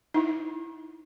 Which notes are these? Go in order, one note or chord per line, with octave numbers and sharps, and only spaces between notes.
D#4 E4